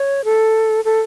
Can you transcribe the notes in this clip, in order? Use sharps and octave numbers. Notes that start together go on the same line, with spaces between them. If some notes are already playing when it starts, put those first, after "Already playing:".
Already playing: C#5
A4
A4